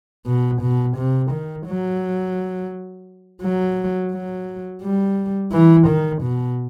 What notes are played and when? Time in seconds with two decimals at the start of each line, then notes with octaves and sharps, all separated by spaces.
0.26 B2
0.61 B2
0.97 C3
1.31 D#3
1.66 F#3
3.42 F#3
4.12 F#3
4.82 G3
5.52 E3
5.87 D#3
6.22 B2